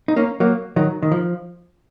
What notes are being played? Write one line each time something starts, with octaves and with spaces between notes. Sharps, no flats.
D#4
A#3 C#4
F#3 A#3
D#3 F#3
D#3
F3